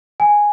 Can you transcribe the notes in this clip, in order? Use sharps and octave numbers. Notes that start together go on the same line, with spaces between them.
G#5